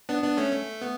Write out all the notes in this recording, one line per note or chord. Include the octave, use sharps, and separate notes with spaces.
B3 D4
B3 D4
A3 C#4
A3
B3